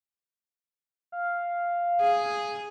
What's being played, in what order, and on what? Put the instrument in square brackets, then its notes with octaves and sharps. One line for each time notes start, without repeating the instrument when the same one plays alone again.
[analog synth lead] F5
[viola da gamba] G#4